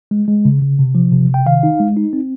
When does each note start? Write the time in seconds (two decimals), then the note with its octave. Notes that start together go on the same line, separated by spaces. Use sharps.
0.11 G#3
0.28 G#3
0.45 C#3
0.62 C#3
0.79 C3
0.95 F3
1.12 C3
1.29 C3
1.34 G5
1.46 D#3 F5
1.63 D#4
1.80 G#3
1.97 D#4
2.13 C4